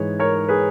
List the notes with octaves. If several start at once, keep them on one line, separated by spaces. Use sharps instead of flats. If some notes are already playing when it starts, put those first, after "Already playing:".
Already playing: G#2 E3 G#4 B4 C#5
A#4 C#5
G#4 B4